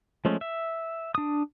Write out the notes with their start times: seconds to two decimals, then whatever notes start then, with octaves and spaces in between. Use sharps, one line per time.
0.25 F3 G#3 A3 C#4
0.41 E5
1.15 D4 D#6